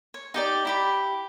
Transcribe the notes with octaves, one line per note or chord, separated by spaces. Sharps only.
C#5
D#4 G4 D5
E4 G4 B5